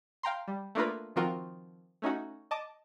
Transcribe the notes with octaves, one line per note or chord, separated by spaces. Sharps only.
F5 G5 A#5 C6
G3
A3 A#3 D4 F4 A#4 B4
D#3 F3 C4 F4 F#4 A#4
A3 C#4 D#4 F#4
D#5 A5 D6